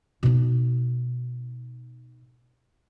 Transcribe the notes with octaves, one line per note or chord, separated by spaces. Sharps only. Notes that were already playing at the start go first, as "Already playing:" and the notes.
B2 D#4